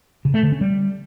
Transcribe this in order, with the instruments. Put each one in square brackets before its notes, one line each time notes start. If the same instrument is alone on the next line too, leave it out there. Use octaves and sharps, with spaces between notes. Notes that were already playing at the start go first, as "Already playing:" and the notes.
[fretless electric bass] C#3
A3
D3
C#4
G3